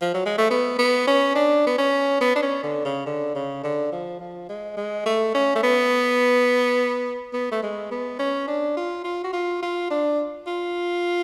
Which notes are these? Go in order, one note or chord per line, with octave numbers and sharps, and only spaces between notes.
F3
F#3
G#3
A3
B3
B3
C#4
D4
B3
C#4
B3
D4
C#4
D3
C#3
D3
C#3
D3
F3
F3
G#3
G#3
A3
C#4
A3
B3
B3
A3
G#3
B3
C#4
D4
F4
F4
F#4
F4
F4
D4
F4